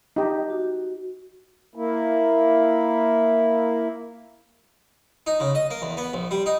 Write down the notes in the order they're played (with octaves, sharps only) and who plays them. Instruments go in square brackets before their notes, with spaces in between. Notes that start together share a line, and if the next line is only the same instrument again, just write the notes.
[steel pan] D#4 G4
[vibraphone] F#4
[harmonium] A#3 E4
[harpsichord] D#4
C#3
D#5
A#3
E2
B3
A#1
G3
D#4